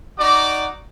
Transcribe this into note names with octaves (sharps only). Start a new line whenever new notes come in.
D#4 F#4 D5 A#5 D6